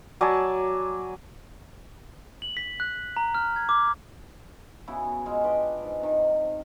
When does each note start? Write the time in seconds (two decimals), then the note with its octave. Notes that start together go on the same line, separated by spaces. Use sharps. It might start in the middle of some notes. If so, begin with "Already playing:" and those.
0.21 F#3 D5 G#5 A5
2.42 F#7
2.57 B6
2.80 F#6
3.17 A#5
3.35 F6
3.56 G#6
3.69 D6
4.87 C#3 B3 E4 F#4
5.26 G#3 F4
5.44 D4 B4 D#5 G5
5.83 G#2
6.02 C3 D#3